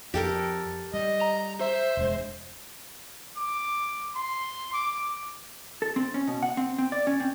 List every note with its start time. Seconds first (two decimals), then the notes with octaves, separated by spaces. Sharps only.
0.14 F2 G4 A4 A#4
0.94 G3 D#5
1.21 A#5
1.60 C5 E5
1.97 E1 G#3
3.37 D6
4.16 C6
4.73 D6
5.82 A4
5.96 C4
6.14 C#4
6.28 B2
6.43 F#5
6.57 C4
6.78 C4
6.92 D5
7.07 C#4
7.20 C4